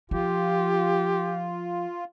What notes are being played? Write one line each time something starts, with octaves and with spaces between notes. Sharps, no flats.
F3 F4 G4